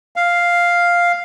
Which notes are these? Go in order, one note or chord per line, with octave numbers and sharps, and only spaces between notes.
F5